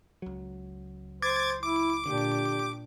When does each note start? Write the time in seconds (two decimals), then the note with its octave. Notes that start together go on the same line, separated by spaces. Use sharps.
0.22 C#2 F#3
1.22 C5 D6 G#6 A6
1.62 E4 D6
2.06 A#2 D3 D4 G4